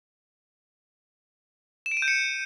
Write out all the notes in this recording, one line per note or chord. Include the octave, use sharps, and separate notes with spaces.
E7
D7
D#7
G6
C#7